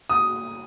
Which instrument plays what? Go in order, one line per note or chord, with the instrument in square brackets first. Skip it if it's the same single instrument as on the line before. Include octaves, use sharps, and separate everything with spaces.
[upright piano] D#6